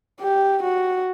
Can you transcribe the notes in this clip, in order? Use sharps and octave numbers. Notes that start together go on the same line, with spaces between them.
G4
F#4